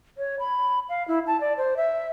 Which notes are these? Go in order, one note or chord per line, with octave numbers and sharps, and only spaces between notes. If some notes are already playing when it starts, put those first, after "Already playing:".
C#5
B5
F5
E4
A5
D5
C5
E5